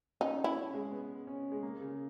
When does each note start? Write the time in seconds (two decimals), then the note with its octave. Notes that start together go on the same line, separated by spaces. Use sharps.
0.21 C#4 D#4
0.39 C#4
0.44 E4
0.57 C#4
0.74 G#3
0.92 B3
1.27 C#4
1.52 G#3
1.62 A#3
1.81 C#3